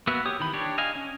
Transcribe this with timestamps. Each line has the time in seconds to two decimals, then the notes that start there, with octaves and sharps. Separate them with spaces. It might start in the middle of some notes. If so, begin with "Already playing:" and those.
0.07 A#3 B3 F#4 B4 E5
0.26 G4 C#5 D#6
0.40 D#3 E3 B5
0.53 D4 G4 C#5
0.78 D#5 F5 G#5
0.95 C#4